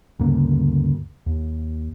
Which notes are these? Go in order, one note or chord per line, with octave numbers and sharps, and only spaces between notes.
D2 G2 C#3 A#3
D#2